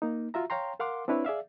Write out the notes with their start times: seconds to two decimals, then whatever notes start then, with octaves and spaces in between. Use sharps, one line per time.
0.02 A#3 D#4
0.34 F4 F#4 E5 A#5
0.50 C#5 F5 G5 A#5 C6
0.80 A#4 F5 F#5 C6 D6
1.08 C4 D4 E4 B4 C#5
1.25 G#4 D5 E5 F5